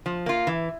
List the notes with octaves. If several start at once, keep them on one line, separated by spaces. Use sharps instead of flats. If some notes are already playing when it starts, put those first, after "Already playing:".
F3
A#3 F4
E3